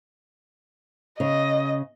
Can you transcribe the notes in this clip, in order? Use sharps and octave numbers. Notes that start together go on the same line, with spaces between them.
C#3 D#5